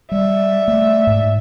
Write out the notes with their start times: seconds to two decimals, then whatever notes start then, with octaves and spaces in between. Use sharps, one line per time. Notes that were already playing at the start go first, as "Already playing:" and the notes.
0.12 G3 D5 E5
0.68 A3
1.07 G#2